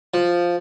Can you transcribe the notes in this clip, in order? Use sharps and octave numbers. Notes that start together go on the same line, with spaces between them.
F3